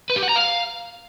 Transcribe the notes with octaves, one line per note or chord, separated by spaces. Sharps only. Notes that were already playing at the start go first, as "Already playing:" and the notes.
B4
G4
F#5
A#5
F5